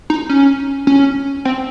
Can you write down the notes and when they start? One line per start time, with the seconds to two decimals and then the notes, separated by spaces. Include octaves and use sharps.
0.10 D#4
0.29 C#4
0.87 C#4
1.45 C4